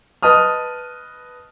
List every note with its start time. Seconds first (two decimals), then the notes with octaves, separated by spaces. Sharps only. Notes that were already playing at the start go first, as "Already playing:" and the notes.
0.23 B4 D#5 A5 D#6 F6